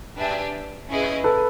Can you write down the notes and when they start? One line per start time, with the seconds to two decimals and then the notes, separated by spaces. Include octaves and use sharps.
0.17 D4 G4 B4 E5 G#5
0.88 C#4 E4 G#4 B4 D#5
1.24 A4 B4